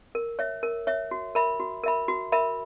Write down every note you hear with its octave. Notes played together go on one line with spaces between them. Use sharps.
A#4
C#5 E5
A#4
C#5 E5
F#4
A#4 E5 B5
F#4
A#4 E5 B5
F#4
A#4 E5 B5